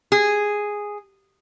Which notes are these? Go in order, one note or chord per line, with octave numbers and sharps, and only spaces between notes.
G#4